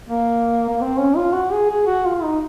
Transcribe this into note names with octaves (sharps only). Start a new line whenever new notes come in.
A#3
A#3
C4
C#4
F4
F#4
G#4
G#4
F#4
F4
D#4